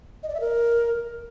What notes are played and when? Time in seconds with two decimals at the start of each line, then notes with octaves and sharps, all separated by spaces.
0.23 D#5
0.29 D5
0.35 E5
0.40 A#4